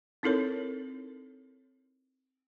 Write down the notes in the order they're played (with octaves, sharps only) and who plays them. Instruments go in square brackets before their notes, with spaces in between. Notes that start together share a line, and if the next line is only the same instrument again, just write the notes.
[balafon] C4 D#4 E4 A4 A#4 C#5